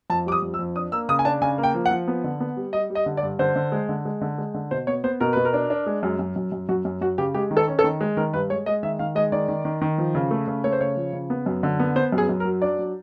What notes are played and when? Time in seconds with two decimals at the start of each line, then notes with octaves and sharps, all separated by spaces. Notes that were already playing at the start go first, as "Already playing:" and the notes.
0.10 F2 A5
0.26 G3 D6
0.32 D#6
0.42 F2
0.54 E6
0.59 F2
0.76 D4 D#6
0.92 A#3 E6
1.09 C#3 D#6
1.19 G#5
1.25 D4 A5
1.41 C#3 G#5
1.58 A#3
1.63 G5
1.75 F3
1.86 F#5
1.91 F3
2.08 B3
2.24 D3
2.40 B3
2.57 G3
2.73 G3 D#5
2.90 G3
2.95 D#5
3.06 D3
3.17 D5
3.23 G2
3.39 D3 C5
3.56 D3
3.72 G#3
3.89 D3
4.05 G#3
4.21 D3
4.38 G#3
4.54 D3
4.71 B2 C5
4.87 B3 C#5
5.04 B3 C5
5.20 B2 A#4
5.33 B2 B4
5.45 A#4
5.53 D4
5.70 D4
5.86 G#3
6.03 F#2
6.19 F#2
6.36 F#2
6.52 F#2
6.69 F#2 F#4
6.85 F#2
7.01 F#2 F#4
7.18 C#3 G4
7.34 G#3 G4
7.51 D#3
7.57 A4
7.68 C#4
7.79 A4
7.84 D#3
8.00 G#3
8.17 D#3 A#4
8.33 G2 B4
8.50 G#3 C#5
8.66 G#3 D#5
8.83 D#3 E5
8.99 D#3 F5
9.15 G#3 D#5
9.32 D#3 D5
9.49 D#3
9.65 D#3
9.82 D#3
9.98 F3
10.15 C#3
10.31 A3
10.47 C#3
10.64 A3 C#5
10.73 C5
10.81 C#3 C#5
10.97 F3
11.13 C#3
11.30 B3
11.46 F#2
11.63 D3
11.79 B3
11.96 B3 C5
12.12 F#2
12.18 G#4
12.29 F#2
12.40 A#4
12.45 F#3
12.62 D4 D5
12.79 F#3